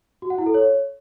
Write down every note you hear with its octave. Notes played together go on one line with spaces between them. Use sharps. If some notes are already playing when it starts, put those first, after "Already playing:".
F#4
F#5
E4
A4
C#5